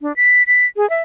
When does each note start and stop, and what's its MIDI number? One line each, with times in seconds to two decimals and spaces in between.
0.02 0.15 62
0.16 0.43 95
0.47 0.66 95
0.76 0.88 68
0.90 1.02 76